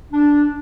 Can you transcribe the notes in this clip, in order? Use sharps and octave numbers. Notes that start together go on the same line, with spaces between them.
D4